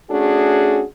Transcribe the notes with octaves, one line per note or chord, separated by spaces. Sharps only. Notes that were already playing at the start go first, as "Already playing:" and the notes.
A3 C#4 D4 F#4 G#4